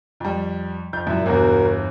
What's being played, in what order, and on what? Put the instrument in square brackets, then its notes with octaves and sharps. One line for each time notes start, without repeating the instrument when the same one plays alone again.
[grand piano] F2 G3
F2 G6
[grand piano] F#2 [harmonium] A#2 E4 E5
[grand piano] G1 E2 [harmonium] B2 F#4 A#4